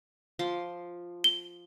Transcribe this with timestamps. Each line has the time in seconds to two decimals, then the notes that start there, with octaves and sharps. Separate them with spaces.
0.39 F3 C6 D6
1.24 G7